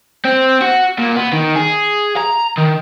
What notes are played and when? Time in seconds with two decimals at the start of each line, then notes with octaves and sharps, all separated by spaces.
0.25 C4
0.62 F#4
0.98 A#2
1.15 B3
1.33 D#3
1.56 G#4
2.17 A#5
2.58 D#3